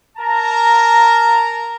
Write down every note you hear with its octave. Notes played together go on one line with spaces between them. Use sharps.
A#4 A5 A#5